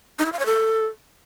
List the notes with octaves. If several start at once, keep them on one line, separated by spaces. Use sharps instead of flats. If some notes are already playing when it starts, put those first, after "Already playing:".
D#4
E4
F5
C#5
A4